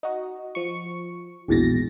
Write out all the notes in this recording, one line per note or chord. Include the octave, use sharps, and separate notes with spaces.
D#4 F#4 D#5
F3 C#6
A#1 E2 G#2 B2 A6 A#6